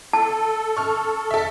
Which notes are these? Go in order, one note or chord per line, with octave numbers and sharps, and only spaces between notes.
A4 A5
C#6 F6
A4 E5